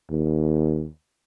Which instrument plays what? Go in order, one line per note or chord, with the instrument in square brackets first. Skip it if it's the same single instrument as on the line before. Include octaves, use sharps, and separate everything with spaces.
[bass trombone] D#2